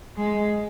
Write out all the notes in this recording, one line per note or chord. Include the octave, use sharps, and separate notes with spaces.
G#3